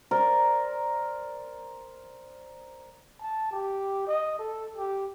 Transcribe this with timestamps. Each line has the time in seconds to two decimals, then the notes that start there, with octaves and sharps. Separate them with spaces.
0.11 A#4 C5 D5
3.22 A5
3.52 G4
4.07 D#5
4.39 A4
4.76 G4